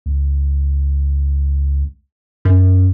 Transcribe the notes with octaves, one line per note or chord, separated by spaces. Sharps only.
C#2
F#2